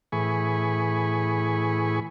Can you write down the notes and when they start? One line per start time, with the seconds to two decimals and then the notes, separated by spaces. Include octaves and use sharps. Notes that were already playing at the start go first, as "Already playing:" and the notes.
0.12 A2 E3 G#4 G#5 B5 C#6